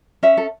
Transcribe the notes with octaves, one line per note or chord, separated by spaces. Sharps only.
C#4 E5
A4